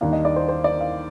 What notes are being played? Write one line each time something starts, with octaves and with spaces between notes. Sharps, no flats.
D#2 D#3 G3 A#3 D4 F5
D#5
D5
C5
C5
D5
F5